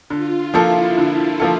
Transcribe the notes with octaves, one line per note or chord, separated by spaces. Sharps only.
D3 F4
F3 A#3 E4 F4 A4
D3
F3 A#3 F4 A4